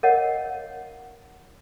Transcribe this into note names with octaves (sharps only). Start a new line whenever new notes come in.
A#4 C#5 D#5 F5 F#5